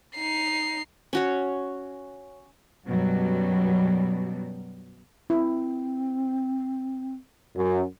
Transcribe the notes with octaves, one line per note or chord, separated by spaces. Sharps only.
D#4 C7
C#4 F#4 C#5
F#2 B2 F#3 G3
C4 E4
F#2